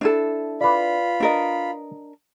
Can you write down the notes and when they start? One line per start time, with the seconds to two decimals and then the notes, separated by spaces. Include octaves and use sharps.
0.01 D4 E4 A4
0.61 F4 B4 D5 B5
1.20 D4 A#4 D#5